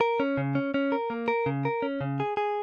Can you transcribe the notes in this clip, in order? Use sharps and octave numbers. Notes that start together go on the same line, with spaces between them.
A#4
C#4
C#3
C#4
C#4
A#4
A#3
A#4
C#3
A#4
C#4
C#3
G#4
G#4